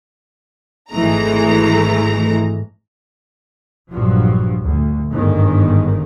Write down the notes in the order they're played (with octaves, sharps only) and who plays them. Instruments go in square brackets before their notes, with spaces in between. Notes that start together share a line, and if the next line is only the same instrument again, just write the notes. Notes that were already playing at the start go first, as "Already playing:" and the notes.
[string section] G#1 G#2 E3 G#3 A3 A#5
[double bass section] A#1 G2 F3 F#3
D2
G1 G#2 D#3